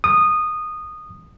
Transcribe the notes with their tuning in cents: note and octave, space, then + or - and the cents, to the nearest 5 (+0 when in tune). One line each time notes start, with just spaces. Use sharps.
D#6 -15